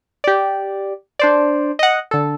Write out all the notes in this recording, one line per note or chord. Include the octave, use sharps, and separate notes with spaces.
G4 D5
D4 C5 D5
D#5 F#5
D3 A4